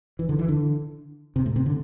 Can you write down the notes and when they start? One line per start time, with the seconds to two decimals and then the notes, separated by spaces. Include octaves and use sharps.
0.19 E3
0.29 D3
0.39 E3
0.48 D3
1.36 C3
1.46 A2
1.56 C3
1.66 D3